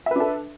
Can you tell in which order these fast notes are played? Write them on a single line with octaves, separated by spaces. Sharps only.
E5 B4 D4 A4